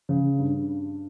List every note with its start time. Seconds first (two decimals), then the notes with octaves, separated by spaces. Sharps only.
0.09 C#3
0.39 G2